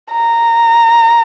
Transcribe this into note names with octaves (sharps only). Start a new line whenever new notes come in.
A#5